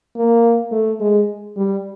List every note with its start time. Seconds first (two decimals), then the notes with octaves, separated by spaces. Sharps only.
0.16 A#3
0.72 A3
1.00 G#3
1.57 G3